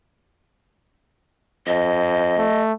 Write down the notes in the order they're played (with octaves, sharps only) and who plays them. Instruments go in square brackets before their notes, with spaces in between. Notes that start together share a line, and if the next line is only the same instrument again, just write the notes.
[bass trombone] F2 [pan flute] D#5
[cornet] A3